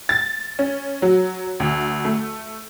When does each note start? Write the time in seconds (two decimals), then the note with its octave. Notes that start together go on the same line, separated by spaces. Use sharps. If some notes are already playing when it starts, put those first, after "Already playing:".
0.09 A6
0.59 C#4
1.02 F#3
1.60 D2
2.05 A3